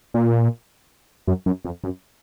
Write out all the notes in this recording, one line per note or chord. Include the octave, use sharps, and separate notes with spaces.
A#2
F#2
F#2
F2
F#2